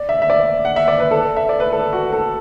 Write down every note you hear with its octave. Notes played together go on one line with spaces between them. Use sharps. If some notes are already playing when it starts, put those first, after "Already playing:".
Already playing: D5
E5
E5
D5
F#5
E5
D5
B4
A4
E5
D5
B4
A4
F#4
A4